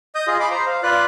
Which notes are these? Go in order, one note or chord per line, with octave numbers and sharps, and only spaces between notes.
D#5 D#6 G6
F4 G#4 D#5
B5 C6 D6
C5 A#5
F5
F4 B4 D5 F#6